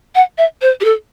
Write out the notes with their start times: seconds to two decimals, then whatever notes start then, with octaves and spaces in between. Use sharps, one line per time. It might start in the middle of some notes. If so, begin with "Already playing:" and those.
0.15 F#5
0.38 E5
0.62 C5
0.80 G4
0.84 A4